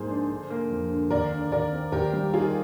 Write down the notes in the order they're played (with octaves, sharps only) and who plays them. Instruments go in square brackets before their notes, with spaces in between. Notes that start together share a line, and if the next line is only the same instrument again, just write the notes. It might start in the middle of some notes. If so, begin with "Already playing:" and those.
Already playing: [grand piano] G#2 F3 A#3 [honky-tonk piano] G#4 C5
[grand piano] D4
D3
A#3
F2
D3
[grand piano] D#2 [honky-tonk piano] A#4 D5
[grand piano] D3
[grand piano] D#2 [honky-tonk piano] A#4 D5
[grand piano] C4
[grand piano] D#2 [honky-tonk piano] G4 A#4
[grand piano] G3
[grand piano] D#3 [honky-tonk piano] F4 G#4